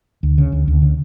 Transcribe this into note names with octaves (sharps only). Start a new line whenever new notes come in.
D2
C#3
D2
D2
C#3